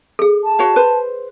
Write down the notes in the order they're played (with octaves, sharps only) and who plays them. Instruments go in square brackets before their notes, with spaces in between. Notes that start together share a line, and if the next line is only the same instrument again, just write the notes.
[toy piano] G#4 A4
[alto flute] A5
[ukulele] F#4 C#5 F5
B4 C5